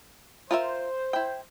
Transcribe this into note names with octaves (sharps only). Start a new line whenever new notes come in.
F4 A#4 C5 E5
E4 G5